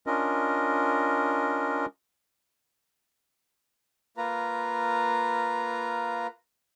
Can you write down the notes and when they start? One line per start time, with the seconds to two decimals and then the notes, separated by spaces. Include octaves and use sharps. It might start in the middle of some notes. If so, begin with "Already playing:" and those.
0.07 C#4 D4 F4 A#4 D#5
4.17 A#3 F4 B4 A#5